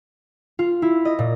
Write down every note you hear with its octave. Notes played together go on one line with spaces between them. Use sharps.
F4
E4
D#5
A#2